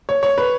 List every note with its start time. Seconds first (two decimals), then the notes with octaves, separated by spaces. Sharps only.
0.09 C#5
0.23 C#5
0.38 B4